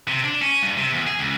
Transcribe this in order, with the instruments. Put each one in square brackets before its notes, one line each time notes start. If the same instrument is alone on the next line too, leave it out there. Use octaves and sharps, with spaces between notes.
[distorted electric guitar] C3
D4
C#4
G2
C3
E2
G#4
C#2